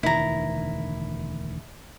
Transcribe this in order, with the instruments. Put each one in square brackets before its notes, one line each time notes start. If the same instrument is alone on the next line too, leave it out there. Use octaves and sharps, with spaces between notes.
[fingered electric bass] E1 D2 D#3 [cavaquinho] E4 A#5